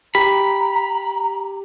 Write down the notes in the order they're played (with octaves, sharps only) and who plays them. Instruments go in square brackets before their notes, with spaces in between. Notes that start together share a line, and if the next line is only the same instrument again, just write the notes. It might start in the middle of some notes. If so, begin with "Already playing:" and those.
[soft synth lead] G4 [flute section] A#5 [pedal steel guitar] B5